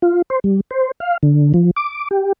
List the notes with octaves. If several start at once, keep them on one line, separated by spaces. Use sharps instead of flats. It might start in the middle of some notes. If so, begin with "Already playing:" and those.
F4
C5
G3
C5
F5
D3
F3
D6
G4